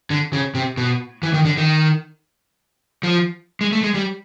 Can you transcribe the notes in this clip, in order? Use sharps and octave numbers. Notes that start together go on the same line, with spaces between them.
D3
C#3
C3
B2
E3
D#3
D3
D#3
F3
G#3
A3
G#3
G3